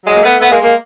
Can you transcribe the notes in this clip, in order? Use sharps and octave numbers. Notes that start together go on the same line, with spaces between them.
F#3 G#3
A#3
A3 B3
A3 B3
G#3 A#3
G#3 A#3